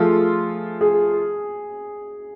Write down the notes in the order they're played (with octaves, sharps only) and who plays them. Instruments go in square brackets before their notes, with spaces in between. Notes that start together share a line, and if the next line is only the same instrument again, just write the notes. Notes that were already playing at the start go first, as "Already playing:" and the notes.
Already playing: [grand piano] F3 A3 F4 A4 [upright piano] G#4
[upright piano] G#4